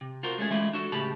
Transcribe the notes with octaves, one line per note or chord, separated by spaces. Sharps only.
C3
F4 F#4 A#4 C5
G#3 A3 C#4 G#4
E3 G#3 A3 C#4 E4 F4
D4 F#4 A4
A2 C#3 G4 A5 B5